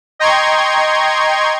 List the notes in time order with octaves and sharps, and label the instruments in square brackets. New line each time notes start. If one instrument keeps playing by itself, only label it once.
[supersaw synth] D#5 G5 A#5 C6 C#6 G#6